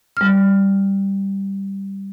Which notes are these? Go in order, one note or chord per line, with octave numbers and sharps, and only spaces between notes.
G3 F6